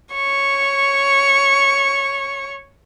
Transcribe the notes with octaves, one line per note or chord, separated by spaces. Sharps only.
C#5 C#6